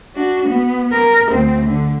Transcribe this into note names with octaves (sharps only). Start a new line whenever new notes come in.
D4 F#4
B3
A#4
D2 C4
D3